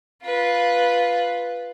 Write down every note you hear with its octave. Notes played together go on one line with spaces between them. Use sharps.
F4 B4